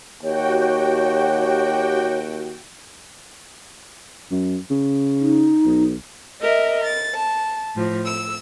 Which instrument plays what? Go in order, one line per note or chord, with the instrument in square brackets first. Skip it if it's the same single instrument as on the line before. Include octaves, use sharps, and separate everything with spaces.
[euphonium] D#2 [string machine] F#4 G5 [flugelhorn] G4 [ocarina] C#5
[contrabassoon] F#2
C#3
[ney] D#4
[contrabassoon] B1
[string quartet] A#4 D#5 E5
A6
A5
A2 F3
E6